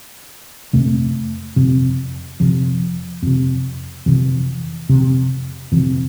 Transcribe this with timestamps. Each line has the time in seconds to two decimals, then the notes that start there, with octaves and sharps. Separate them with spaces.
0.73 F2 C3 A3
1.56 F2 C3
2.40 F2 C3 F3
3.22 F2 C3
4.06 F2 C3 E3
4.89 F2 C3
5.72 F2 C3 E3